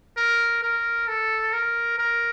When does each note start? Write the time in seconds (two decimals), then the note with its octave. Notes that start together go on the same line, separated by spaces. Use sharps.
0.17 A#4
0.63 A#4
1.08 A4
1.53 A#4
1.99 A#4